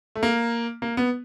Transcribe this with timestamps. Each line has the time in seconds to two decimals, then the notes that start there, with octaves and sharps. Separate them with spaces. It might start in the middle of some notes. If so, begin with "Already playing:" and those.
0.15 A3
0.23 A#3
0.82 A#3
0.97 B3